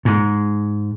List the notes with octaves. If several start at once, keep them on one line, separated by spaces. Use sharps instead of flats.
G#2